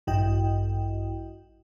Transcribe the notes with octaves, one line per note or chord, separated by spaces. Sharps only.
A1 G2 E4 F#4 D#5 G5